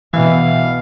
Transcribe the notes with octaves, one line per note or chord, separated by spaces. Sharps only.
B2 E3 F5